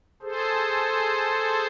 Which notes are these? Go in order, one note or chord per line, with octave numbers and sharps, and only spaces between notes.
G#4 A4 C5